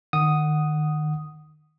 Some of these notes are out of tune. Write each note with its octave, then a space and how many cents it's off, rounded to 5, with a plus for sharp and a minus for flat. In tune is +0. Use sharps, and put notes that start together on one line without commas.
D#3 -25 F#5 +0 D#6 +0